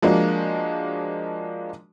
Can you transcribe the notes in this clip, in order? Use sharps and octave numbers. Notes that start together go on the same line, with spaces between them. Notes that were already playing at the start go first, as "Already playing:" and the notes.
F3 G#3 A#3 D4 F#4